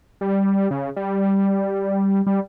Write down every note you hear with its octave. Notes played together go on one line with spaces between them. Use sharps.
G3
C#3
G3
G3